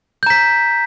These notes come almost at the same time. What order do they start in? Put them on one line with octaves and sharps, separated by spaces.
G6 A#5 B6